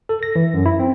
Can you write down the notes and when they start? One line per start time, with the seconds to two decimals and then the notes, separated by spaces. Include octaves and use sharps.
0.09 A4
0.23 A#6
0.36 E3
0.54 F#2
0.66 E4
0.79 C4